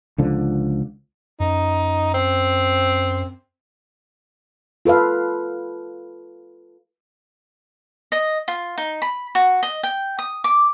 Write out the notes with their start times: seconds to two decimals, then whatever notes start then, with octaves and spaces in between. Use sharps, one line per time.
0.18 C#2 D3 F3
1.40 F#2 D#4
2.14 C4
4.85 F4 A4 B4 F5
8.12 D#5
8.48 F4
8.78 D#4
9.02 B5
9.35 F#4
9.63 D#5
9.83 G5
10.19 D#6
10.44 D6